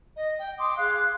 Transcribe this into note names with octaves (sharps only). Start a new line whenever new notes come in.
D#5
G5
C6 D6 D#6
G#4 F5 F#6